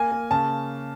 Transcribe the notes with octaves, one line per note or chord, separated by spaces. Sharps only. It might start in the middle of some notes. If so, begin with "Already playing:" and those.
Already playing: A#3 G#5
A#3
C#3 A5